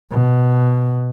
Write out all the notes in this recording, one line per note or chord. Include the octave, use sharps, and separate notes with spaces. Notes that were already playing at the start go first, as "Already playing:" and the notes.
B2